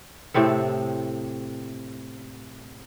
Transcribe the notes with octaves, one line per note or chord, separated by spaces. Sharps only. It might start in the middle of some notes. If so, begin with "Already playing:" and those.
A2 C3 C4 A4